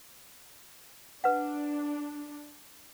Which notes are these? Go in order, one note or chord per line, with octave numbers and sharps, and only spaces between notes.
D4 B4 F#5